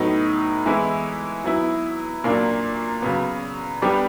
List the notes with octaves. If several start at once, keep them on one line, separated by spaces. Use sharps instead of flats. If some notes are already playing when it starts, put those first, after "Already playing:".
Already playing: A2 F#3 B3 D#4
E3 G#3 B3 E4
F#3 B3 E4
A#2 F#3 A#3 D4
C#3 F#3 B3
G3 B3 D4 G4